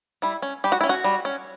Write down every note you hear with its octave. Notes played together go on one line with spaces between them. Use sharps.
G3 E4
C#4
G3 G4
F#4
C#4 E4
F#4
G3
C#4